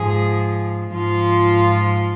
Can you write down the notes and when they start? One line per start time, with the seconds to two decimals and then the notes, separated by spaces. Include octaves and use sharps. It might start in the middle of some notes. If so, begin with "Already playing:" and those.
Already playing: G#2 F3 G#4
0.93 G#2 F3 F4